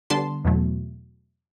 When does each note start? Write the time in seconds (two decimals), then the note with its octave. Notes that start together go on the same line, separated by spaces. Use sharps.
0.10 D3 G3 B3 D4 A5 C6
0.45 E2 B2 F#3 A3